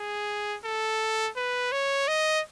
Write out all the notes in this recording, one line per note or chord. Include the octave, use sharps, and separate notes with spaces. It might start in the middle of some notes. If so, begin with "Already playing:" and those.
Already playing: G#4
A4
B4
C#5
D#5